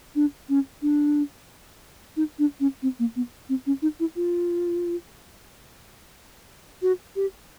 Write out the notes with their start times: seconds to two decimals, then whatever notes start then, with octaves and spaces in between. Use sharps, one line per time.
0.15 D4
0.49 C#4
0.82 D4
2.17 D#4
2.39 D4
2.60 C#4
2.83 C4
2.99 A#3
3.16 B3
3.49 C4
3.66 C#4
3.82 D#4
4.00 E4
4.16 F4
6.82 F#4
7.16 G4